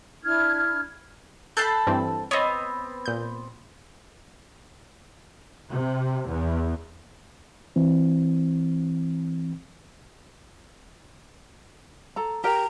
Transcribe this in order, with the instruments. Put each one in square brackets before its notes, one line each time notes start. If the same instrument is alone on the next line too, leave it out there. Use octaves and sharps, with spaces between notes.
[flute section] D4 E4 F6 G#6
[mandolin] A4 A5 B5 [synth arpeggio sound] F#6 G6 C7
[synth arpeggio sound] G2 E3 C4
[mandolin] B3 C4 [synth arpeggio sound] C#5 D#5
[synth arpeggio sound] A#2 G6
[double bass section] C3
E2
[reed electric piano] E3 C4
[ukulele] A4 A#5
[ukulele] G4 A#4 G5 [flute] A#5